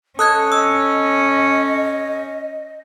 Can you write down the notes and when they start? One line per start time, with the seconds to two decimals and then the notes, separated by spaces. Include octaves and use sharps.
0.19 C#4 A4 D#5 D#6 F#6 G#6
0.52 D#5 E6